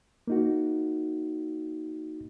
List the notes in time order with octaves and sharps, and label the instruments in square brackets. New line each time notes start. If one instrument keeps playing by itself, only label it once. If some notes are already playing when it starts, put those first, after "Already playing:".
[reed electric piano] A#3 D#4 F#4